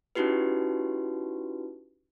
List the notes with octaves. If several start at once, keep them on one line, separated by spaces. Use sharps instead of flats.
C#4 D#4 E4 F#4 G4 B4